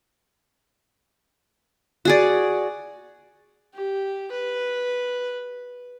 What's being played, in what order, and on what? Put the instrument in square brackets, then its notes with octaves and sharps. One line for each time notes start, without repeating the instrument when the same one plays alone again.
[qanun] F#4 G#4 D5
[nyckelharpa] G4
B4